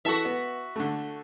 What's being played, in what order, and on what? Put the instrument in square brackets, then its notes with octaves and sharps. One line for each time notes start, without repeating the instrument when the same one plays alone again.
[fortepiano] E3 A4 [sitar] F#4 E5
[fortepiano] B3
D3 A3